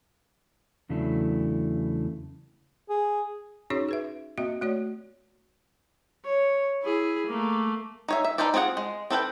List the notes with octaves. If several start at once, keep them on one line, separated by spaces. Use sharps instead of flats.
E2 C#3 F#3 A3 D4 E4
G#4
C#4 D#4 F#4 G#4 C#5 C#6
G#4 B4 E5
A#3 C4 F#4 D#5 E5
A3 F#4 C#5 D5
C#5
E4 G#4
A3 A#3
D#4 C#5 E5
E5
D#4 A4 B4 C5 D5
C4 D4 F4 G#4 F#5
G#3
C4 A4 B4 G5